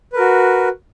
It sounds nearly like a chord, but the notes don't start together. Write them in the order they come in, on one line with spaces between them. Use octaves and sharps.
B4 A#4 F#4